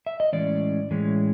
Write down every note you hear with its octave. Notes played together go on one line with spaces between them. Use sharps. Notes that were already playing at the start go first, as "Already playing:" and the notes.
E5
D#5
A2 E3 G#3 C#4 D5
A2 E3 G#3 C#4